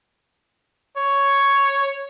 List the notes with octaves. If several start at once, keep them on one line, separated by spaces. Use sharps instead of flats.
C#5